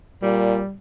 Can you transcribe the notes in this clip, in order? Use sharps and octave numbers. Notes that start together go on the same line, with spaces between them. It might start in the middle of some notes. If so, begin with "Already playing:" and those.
A#2 G3